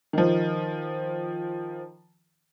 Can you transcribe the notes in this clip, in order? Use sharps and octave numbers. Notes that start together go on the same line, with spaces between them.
D#3 F3